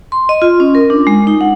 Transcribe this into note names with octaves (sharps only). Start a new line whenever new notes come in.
C6
D#5
F4
C#4
A#4
D4
G#3
D#4
F#5